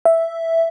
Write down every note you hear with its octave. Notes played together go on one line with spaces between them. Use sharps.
E5